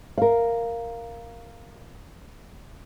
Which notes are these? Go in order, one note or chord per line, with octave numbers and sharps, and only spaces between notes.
A#4 F5